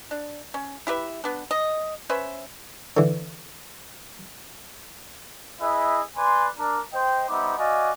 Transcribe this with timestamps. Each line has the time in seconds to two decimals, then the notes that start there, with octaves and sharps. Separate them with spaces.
0.11 D4
0.54 C#4
0.87 E4 G4 B4 E5
1.24 B3 D4
1.51 D#5
2.09 C#4 B4 C5 E5
2.97 D3 E3
5.60 E4 G#4 B4 D#5 E5
6.17 B4 D5 G#5 C6
6.58 D4 A#4
6.93 C5 D#5 G5
7.29 G3 B3 D#4 C5 E5 D6
7.58 F#4 D5 D#5 F5 G#5